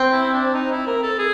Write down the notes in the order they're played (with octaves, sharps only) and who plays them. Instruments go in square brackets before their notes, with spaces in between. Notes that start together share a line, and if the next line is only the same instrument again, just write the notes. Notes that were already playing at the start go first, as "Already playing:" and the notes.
Already playing: [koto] C4
[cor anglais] E4
D4
D#4
E4
A#4
A4
G#4